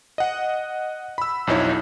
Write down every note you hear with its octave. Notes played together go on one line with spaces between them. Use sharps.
D#5 F#5
B5 E6
B1 F2 D#4 E4 C#5